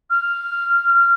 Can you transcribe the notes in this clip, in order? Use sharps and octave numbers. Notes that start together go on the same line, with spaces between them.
F6